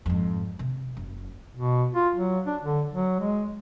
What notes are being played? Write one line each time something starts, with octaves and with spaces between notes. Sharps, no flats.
F2 G#2
C3
F#1
B2
F4
F#3
D4
D3
F#3
G#3